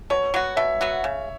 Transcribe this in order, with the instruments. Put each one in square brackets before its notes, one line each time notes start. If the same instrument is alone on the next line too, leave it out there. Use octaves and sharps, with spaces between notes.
[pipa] B2 [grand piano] C#5
[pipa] F#3 B3 F#4
[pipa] B2 [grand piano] E5
[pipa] F#3 B3 F#4
C#3